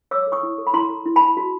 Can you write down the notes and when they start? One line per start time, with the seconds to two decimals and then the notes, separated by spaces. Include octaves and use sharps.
0.11 C#5 D6 E6
0.27 A4
0.32 C#6 D#6
0.43 E4
0.58 A4
0.67 B5
0.73 E4 A#5 C6
0.89 A4
1.06 E4
1.16 E4 A5 B5
1.37 F#4